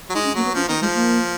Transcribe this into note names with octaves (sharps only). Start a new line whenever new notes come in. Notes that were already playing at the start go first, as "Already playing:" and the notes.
F#3
G#3 D#4
C#4
F#3 A#3
B3
F3 C#4
D#3 B3
F3 G#3
A#3